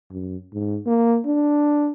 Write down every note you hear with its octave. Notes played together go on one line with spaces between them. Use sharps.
F#2
G#2
A#3
D4